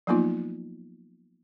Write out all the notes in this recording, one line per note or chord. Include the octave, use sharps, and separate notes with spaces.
F3 F#3 A#3 B3 D#4 F4